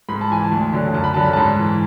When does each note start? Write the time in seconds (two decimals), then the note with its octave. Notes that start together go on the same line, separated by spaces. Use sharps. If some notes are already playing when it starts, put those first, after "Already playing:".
0.09 G#2 B5
0.21 A5
0.31 E3 G#5
0.43 A5
0.51 D2
0.73 D3 F#3
0.94 F#2 A5
1.04 B5
1.14 D3 F#3 A5
1.24 B5
1.33 G#2 A5
1.59 E3